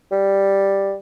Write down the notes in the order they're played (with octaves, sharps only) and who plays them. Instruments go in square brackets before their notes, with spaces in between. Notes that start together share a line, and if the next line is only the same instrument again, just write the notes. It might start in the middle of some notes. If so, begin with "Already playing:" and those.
[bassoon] G3